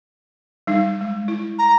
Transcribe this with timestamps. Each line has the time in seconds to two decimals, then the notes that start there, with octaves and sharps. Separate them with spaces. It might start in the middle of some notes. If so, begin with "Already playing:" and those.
0.67 G3 D#4
1.01 G#3
1.28 E4
1.59 A#5